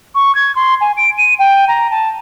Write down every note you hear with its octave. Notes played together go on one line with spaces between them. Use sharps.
C#6
G#6
C6
G#5
D7
D#7
G5
A#5
A5